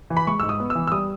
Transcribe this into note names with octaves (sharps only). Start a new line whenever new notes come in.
E3
B5
G#3 C#6
G#2 E6
D#6
B3
E6
E3
E6
G3 D#6